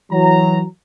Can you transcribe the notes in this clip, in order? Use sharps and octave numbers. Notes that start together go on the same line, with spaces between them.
E3 F#3 A#5